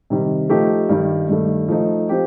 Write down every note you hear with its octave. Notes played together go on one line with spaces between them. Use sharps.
C3 D#3 G3
F3 A3 D#4 G4
G2 D#3 G3
G2 D#3 A3
F3 A3 D#4
F3 C4 G4